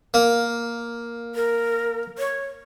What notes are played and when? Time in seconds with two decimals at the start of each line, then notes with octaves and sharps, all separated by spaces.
0.14 A#3
1.35 A#4
2.18 C#5